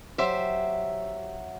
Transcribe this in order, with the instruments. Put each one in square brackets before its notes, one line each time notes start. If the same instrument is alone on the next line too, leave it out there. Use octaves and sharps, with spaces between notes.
[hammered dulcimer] F#3 [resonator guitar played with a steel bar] G4 C5 [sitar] E5